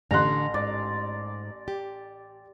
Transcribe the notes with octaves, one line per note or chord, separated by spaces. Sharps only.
A1 D3 A#5 C6 F#6
G#2 D5
G4